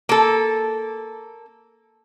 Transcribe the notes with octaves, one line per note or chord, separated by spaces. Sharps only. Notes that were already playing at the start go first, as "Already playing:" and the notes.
A#3 A4